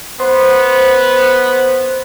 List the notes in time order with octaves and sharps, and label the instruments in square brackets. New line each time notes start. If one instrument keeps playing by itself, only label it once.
[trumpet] B3 [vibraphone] C5 C6